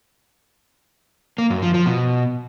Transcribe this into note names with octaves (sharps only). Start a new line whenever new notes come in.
A#3
F#2
F3
F3
B2